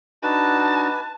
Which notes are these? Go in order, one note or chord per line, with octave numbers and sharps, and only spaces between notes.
D4 D#4 F#4 B4 A5